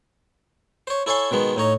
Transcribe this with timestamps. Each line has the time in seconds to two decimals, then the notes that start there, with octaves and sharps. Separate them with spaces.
0.87 C5 C#5
1.06 E4 A4 C#5 G#5 C6
1.31 B2 D#3 G#3 B3
1.56 A2 D#4 C#5 A#5